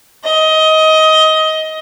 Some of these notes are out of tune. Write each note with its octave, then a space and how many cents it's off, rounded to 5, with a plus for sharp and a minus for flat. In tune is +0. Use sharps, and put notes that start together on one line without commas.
D#5 +20